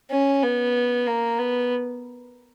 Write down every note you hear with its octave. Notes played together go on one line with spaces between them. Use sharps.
C#4
B3
A#3
B3